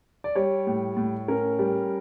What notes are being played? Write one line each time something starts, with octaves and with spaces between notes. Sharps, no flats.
D5
G3 C#5
A2
A2
C#4 A#4
G3